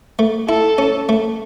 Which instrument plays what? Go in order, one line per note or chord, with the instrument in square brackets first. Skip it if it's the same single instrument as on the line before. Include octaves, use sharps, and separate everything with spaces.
[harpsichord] A3
[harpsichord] E4 [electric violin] A4
[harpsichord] C#4
A3